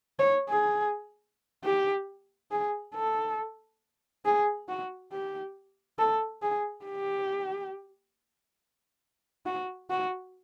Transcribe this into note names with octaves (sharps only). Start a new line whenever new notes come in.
C#5
G#4
G4
G#4
A4
G#4
F#4
G4
A4
G#4
G4
F#4
F#4